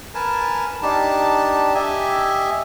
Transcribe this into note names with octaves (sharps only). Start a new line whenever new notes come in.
A#4 B4 G#5 A5
D4 D#4 G4 A5
G4 D#5 E5 G#5